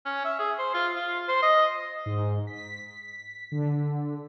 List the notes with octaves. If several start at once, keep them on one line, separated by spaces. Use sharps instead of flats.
C#4
E5
G#4
C5
F4
F4
C5
D#5
G#2
B6
D3